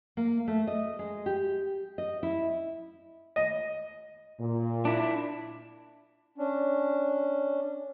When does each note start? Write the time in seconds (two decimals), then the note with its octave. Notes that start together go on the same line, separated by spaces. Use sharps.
0.17 A#3
0.48 A3
0.67 D#5
0.99 G#3
1.26 G4
1.98 D#5
2.23 E4
3.36 D#5
4.40 A#2
4.85 D4 E4
6.38 C#4 D4